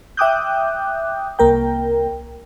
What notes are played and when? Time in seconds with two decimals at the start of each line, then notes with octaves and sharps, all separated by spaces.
0.17 E5 G5 D6 D#6 F#6 G6
1.39 C2 A#3 A#4 G5